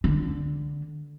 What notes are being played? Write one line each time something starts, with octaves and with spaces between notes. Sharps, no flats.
D3